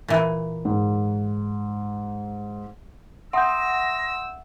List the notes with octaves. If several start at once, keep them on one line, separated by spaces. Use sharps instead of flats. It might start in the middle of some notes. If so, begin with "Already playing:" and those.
A#2 E3
G#2
E5 F#5 C6 D#6 E6 G6 A#6